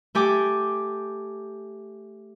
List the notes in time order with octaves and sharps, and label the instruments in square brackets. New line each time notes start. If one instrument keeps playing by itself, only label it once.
[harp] A3 G4 G#5 D6